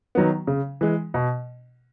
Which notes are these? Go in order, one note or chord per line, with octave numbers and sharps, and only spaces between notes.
D#3 F#3 B3
C#3
E3 G#3
B2